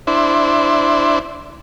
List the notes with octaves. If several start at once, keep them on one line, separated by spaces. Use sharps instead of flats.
D4 E4 C5